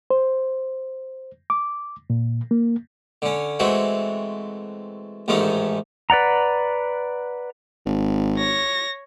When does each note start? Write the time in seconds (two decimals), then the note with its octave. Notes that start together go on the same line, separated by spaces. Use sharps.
0.10 C5
1.50 D6
2.10 A#2
2.51 A#3
3.22 D3 C#4
3.60 E3 G#3 A3 C4 F#4
5.28 A1 G#2 D#3 A3 C#4 D#4
6.10 B4 D5 F#5 A#5
7.86 G#1
8.37 C#5 A#6